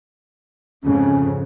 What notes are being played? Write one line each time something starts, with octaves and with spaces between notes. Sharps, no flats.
F2 G#2 C#3 C#4